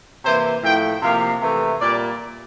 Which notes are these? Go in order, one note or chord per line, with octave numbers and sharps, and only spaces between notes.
C3 E3 A#3 C5
A2 F3 A3 G5
C3 F3 A#3 F5
C3 E3 A3
A#2 G3 A#3 D5